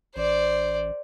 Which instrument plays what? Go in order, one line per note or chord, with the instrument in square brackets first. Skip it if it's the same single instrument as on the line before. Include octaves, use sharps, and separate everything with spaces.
[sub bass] A1 [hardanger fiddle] C5 D5